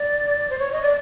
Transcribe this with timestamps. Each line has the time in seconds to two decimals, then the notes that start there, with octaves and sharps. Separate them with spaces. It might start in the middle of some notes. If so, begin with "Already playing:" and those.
Already playing: D5
0.50 C5
0.59 C#5
0.72 D#5
0.82 D5